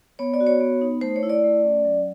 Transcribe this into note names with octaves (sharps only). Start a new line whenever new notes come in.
B3 C#5
D5
F#4
C#5
B3
D#4
A3 C5
C#5
E4
D5
A3
C#4
F#3